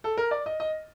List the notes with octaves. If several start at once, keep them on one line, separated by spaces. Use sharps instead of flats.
A4
A#4
D5
D#5
D#5